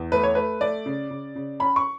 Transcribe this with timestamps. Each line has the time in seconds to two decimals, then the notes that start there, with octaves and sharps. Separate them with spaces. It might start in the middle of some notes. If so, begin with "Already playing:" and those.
Already playing: E2
0.12 A3 B4
0.23 C#5
0.35 A3 B4
0.61 A3 D5
0.86 C#3
1.10 C#3
1.35 C#3
1.60 C#4 B5
1.76 C#6